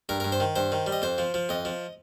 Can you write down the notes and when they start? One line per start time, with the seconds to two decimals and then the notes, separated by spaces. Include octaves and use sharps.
0.09 G2 A#4
0.20 G2 A#4
0.32 C5
0.40 D#3
0.56 G2 C5
0.72 D#3
0.87 G3
0.92 D#5
1.02 F2 C5
1.18 F3
1.34 F3
1.49 F2 D#5
1.65 F3